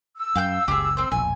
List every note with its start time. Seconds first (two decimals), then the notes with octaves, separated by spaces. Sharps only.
0.17 E6
0.36 F#2 F5 G5 G6
0.68 F#1 C#2 G4 G#4
0.97 C4 C5
1.12 E1 A#1 G#5